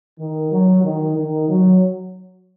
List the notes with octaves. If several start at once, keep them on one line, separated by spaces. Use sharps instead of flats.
D#3
F#3
D#3
D#3
F#3